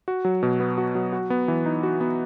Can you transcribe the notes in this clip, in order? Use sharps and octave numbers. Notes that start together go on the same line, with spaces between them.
F#4
F#3
B2
B3
F#4
F#3
F#4
B3
E3
D#4
F#4
B3